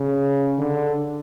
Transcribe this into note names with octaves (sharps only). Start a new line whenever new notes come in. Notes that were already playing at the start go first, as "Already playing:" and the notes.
Already playing: C#3
D3